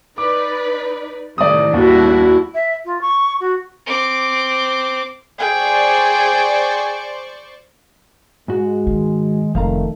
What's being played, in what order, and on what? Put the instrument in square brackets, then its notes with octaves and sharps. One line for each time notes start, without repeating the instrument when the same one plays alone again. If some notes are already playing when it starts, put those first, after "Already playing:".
[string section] D#4 B4 D5 [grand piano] D6
[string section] A2 C3 D#3 [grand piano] D5 D#6
[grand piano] D#2 [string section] G3 D4 [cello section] E4 F#4
[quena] E5
F4
C#6
F#4
[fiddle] C4 D6
[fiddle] G#4 G5 [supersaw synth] C5 D5 C#6
[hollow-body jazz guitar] G#2 F#4 [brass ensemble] G#3
[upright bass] D#3
[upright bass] F1 [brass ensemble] D#3 A3 [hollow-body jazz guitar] F3 F5 A#5